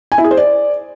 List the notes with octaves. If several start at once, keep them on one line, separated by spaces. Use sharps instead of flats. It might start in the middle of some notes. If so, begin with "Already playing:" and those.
G#5
E4
G#4
C5
D5